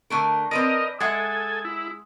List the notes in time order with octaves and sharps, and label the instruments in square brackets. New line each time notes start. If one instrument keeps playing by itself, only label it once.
[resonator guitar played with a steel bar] D3 A3 A#4
[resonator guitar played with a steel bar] C4 B4 D5 [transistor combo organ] A#4 D#5
[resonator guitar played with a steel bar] G#3 E5 F#5 [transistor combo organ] A4 G#5
[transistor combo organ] E4